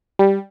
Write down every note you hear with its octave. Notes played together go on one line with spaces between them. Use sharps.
G3